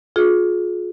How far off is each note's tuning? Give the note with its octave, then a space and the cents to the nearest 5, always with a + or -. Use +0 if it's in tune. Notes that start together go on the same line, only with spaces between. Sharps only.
F4 +40 G#4 +35